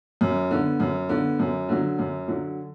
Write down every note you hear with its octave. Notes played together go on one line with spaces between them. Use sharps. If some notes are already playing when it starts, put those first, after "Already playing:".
F#2
D3 B3
F#2
D3 B3
F#2
D3 F#3
F#2
D3 F#3